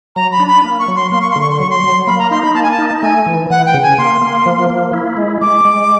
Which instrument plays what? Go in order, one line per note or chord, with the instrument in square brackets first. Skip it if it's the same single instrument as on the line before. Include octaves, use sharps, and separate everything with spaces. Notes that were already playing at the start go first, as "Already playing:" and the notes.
[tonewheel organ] F#3 [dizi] A#5
[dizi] B5
[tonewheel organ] D4
[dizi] B5
[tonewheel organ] A#3
[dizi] C#6
[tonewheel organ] F#3
[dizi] C6
[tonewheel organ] A#3 [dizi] C6
[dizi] C#6
C6
[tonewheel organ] D3
[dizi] C#6
C6
[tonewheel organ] F#3 [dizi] C#6
[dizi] C6
[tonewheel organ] F#3
[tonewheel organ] A#3 [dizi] B5
[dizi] A#5
[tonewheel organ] D#4 [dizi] C6
[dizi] B5
[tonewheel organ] A#3 [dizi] A5
[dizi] G#5
A5
[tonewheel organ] D#4
[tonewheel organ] A3 [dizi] G#5
[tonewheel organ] E3
[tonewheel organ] E3 [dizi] F#5
[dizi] G5
[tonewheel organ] C#3
[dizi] G#5
[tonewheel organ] A#3 [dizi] C6
[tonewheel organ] A#3
F3
A#3
E4
G#3
[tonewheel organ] G#3 [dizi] D6
[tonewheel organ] G#3